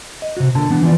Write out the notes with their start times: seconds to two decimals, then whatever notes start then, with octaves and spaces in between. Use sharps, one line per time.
0.22 D#5
0.37 C3 F#4
0.55 A#2 D3 A5
0.70 E3 B3 D4
0.82 E3 F3 B3 D5